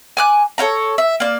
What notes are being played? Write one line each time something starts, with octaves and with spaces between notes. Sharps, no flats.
G#5 D6 F#6
A4 C#5 F5 A#5
E5
A#3 D5